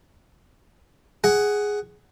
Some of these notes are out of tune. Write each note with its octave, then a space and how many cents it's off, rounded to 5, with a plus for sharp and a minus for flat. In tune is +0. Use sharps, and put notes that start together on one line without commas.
G#4 +0 F#5 +10